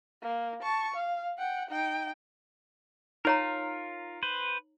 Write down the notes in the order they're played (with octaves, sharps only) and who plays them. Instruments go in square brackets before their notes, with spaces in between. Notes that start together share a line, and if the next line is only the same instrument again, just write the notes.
[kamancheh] A#3
A5 C#6
F5
F#5 G5
D#4 G5
[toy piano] D#4 C#5 A#5 [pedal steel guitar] F4 A#4
[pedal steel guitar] B4 C5